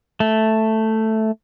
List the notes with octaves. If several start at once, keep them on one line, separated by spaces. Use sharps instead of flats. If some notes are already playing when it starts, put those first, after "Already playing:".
A3